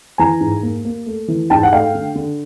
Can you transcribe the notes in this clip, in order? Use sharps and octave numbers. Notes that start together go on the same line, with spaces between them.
E3 G#5 A#5
G#2
A#3
A#3
A3
E3
G#2 G5 A5
F#5
A3 F5 G5
D3
D3